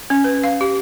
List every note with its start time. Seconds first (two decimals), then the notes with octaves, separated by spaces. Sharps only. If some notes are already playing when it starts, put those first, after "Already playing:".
0.10 C#4
0.24 B4
0.44 F5
0.61 G4